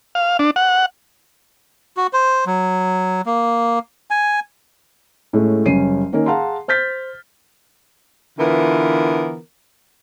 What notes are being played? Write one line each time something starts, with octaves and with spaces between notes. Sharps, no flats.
F5
D4
F#5
F#4
C5
F#3
A#3
G#5
A2 G#3 A3 C#4
F#1 G3 C#4 C7 D#7
D#3 A#3 C#4 D#4 A#4
G#4 F5 F#5 A5 A#5 C6
C5 F6 G6 A6 B6
D3 E3 B3 F4 A#4